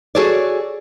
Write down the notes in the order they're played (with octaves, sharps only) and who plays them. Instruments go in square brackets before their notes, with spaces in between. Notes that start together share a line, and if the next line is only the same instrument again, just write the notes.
[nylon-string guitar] F#4 G#4 A4 C#5 D5